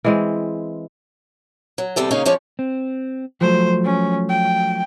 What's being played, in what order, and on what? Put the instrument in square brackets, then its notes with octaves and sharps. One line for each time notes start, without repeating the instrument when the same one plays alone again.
[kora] E3 G#3 C4
[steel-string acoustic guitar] F#3
E2 C3 G3 A4
C#3 A#3 C#4 D#4
F3 G#3 C#4 C#5 D5
[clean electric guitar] C4
[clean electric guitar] F3 F#3 A3 [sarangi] C5
[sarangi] C#4
G5